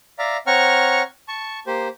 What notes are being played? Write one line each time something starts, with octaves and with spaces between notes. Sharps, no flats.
D5 E5 F5 A#5
C4 C#5 F#5 A#5 C#6 F6
A5 C#6
A#3 G4 C5